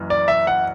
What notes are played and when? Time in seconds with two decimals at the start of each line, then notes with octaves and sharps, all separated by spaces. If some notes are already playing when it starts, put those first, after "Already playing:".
Already playing: F#1 F#2 E3
0.10 D5
0.28 E5
0.47 F#5